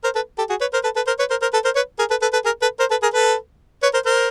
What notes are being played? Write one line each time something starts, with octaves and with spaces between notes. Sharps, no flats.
A#4 C5
A4 B4
G4 A4
F#4 G#4
B4 C#5
A#4 C5
A4 B4
A4 B4
A#4 C5
B4 C#5
A#4 C5
A#4 C5
A4 B4
A#4 C5
B4 C#5
G#4 A#4
A4 B4
A4 B4
A4 B4
G#4 A#4
A4 B4
A#4 C5
A4 B4
G#4 A#4
A4 B4
B4 C#5
A#4 C5
A#4 C5